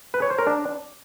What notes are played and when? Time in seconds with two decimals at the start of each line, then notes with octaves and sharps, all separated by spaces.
0.14 B4
0.22 C#5
0.30 C5
0.38 A#4
0.47 D4